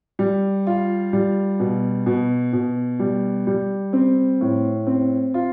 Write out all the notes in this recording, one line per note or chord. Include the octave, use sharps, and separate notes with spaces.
G3
F4
G3
B2
B2
B2
G3
G3
C4
A2
C4
F4